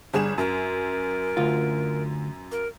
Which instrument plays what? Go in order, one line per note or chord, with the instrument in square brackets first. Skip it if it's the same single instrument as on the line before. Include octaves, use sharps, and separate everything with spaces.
[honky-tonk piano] G1 G#4 E7 [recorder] G3
[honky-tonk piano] F#2 [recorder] A#4
[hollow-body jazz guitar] D2 F4
[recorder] A#4